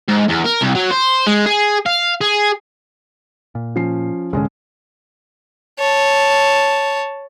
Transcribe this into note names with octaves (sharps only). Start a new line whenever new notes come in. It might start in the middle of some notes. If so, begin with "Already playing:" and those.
G#2
E2
A#4
C2
F#3
C5
G#3
G#4
F5
G#4
A#2
F3 C#4 C7
C2 G#2 D3 G#3 C#4
C#5 A5